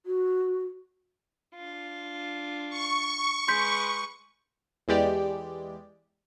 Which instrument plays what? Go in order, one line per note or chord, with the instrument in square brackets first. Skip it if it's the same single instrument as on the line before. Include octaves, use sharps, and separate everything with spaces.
[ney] F#4
[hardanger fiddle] D4 F4
[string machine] C#6
[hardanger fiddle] G#3 B4 [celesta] C6 G6 B6
[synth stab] E2 E3 G#3 G4 D5 G5